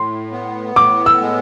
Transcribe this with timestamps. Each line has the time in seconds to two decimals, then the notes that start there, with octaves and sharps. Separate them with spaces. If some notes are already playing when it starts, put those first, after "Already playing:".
Already playing: A2 C6
0.32 B3
0.76 A2 D6
1.06 E6
1.21 G#3